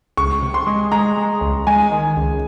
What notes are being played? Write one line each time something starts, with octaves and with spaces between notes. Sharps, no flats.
C#2 C#6
C3
C6
G#3
G#3 A#5
G#3
C#2
G#3 G#5
D#3
C#2